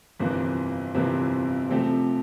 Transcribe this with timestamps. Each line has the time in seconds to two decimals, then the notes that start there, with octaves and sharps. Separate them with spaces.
0.19 G1 F2 C3 E3 A#3
0.94 G1 F2 C3 E3 A#3
1.69 C3 F3 A3 C4 G4